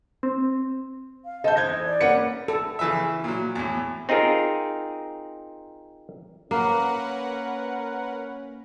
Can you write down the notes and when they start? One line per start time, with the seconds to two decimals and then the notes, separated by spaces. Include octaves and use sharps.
0.23 C4
1.25 F5
1.44 A4 C5 D#5 G6
1.57 E3 C5 D#5 G6 G#6
1.85 D5
2.01 A#3 C#4 B4 F#5 C#7
2.48 A4
2.79 C#3 E3 E5
3.24 A#2 F#3
3.55 E2 A2
4.09 C4 D#4 F4 G#4 A#4
6.51 A#3 C#4 A#4 B4 F#5